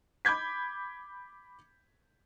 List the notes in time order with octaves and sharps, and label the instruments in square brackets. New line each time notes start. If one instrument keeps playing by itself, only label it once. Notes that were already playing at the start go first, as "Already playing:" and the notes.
[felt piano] B5 D6 G6 G#6 B6